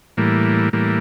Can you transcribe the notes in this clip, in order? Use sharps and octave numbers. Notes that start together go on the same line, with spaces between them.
A2 E3 G3 A#3
A2 E3 G3 A#3